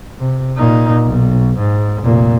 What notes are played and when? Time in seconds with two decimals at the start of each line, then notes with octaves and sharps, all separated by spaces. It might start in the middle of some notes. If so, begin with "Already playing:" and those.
0.20 C3
0.57 A#2 D#4
1.04 B1
1.58 G#2
2.03 F1 A#2